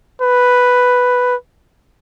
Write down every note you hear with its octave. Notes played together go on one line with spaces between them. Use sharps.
B4